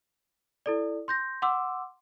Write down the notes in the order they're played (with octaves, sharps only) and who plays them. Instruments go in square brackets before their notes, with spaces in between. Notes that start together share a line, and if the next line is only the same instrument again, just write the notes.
[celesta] E4 A4 D5
C6 G6 A#6
F#5 C6 D6 E6